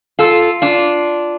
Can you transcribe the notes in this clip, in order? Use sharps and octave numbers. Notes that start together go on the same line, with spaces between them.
F4 A4
D4 F4